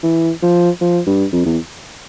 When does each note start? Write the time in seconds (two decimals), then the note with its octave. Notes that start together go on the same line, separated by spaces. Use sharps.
0.03 E3
0.42 F3
0.81 F3
1.07 G2
1.33 F2
1.45 E2